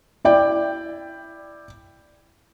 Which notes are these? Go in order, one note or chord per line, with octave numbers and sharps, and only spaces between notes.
E4 D5 G5